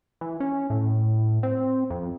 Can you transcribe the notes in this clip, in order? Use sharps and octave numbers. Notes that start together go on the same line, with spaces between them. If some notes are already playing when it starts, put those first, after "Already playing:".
E3
C#4
A2
C4
F2